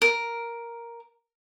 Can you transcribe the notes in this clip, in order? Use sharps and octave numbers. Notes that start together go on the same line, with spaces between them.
A#4